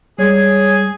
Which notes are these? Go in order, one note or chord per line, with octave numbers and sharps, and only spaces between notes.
G3 G#3 G#4 C#5